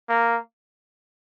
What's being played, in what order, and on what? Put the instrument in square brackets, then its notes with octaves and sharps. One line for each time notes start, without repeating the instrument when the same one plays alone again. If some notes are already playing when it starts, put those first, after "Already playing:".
[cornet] A#3